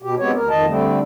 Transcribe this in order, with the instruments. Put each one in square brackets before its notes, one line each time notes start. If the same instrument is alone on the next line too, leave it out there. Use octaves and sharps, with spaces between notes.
[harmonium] B2 G4
G#3 B3 C4 G4 C#5
D2 A#4
F2 D#3 D#5 A5
D3 G3 A3 C4